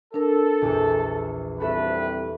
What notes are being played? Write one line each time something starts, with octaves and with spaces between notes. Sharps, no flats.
D4 A4 A#4
A#1 E2
C2 C3 F#4 A4 B4 E5